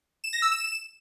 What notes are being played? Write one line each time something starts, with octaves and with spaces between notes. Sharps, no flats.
E7
A#6
E6
E7